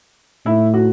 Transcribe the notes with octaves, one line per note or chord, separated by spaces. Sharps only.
A2 E4
F#4